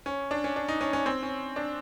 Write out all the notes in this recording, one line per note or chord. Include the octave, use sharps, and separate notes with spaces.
C#4
D4
C#4
D4
D#4
C#4
C#4
C4
C#4
D4